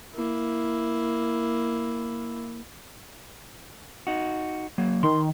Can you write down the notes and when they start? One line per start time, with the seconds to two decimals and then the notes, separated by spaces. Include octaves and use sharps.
0.15 A#3 E4
4.07 D#4 F#4
4.78 F#3 A#3
5.03 D#3 C6